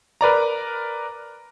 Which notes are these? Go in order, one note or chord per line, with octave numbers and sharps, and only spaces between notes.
A#4 B4 D5 A#5